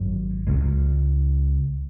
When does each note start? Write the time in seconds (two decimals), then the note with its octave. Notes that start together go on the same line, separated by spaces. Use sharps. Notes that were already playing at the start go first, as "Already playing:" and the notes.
Already playing: G#1 F#2 F#3
0.47 C#2 C#3 G#3